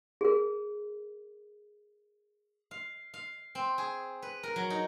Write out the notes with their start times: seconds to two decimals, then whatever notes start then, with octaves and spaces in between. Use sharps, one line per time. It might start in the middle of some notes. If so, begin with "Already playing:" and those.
0.21 G#4 A#4
2.71 F5
3.14 F5
3.55 C4
3.78 G#4
4.22 B4
4.43 A#4
4.56 F#3
4.70 D#4